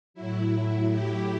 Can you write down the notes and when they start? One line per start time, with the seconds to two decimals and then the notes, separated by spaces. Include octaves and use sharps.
0.14 A2 F#3 E4
0.91 G4